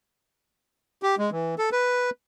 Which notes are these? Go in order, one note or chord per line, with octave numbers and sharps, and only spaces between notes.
G4
G#3
E3
A4
B4